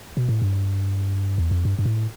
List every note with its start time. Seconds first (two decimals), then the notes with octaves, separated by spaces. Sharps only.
0.17 B2
0.29 A2
0.42 G2
1.38 E2
1.51 F2
1.65 G2
1.79 G2
1.85 A2